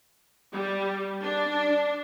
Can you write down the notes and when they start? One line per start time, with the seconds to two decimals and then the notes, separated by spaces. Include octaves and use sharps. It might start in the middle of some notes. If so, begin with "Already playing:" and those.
0.53 G3
1.22 D4